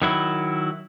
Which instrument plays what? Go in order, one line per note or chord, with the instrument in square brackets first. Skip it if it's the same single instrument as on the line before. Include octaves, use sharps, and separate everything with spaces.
[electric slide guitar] D#3 F#3 E4